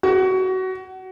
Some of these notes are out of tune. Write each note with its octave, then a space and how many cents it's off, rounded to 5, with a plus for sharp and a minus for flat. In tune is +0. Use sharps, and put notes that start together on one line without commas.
F#4 +20